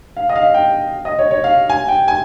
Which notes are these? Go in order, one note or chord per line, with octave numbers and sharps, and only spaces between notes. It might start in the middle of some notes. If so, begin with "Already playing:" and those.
F5
D#5
F5
G5
D#5
C#5
C#5
F5
G#5
G5
G#5